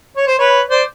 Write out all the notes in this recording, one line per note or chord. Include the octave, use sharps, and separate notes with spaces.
C#5
C5
B4 C#5
C5 D5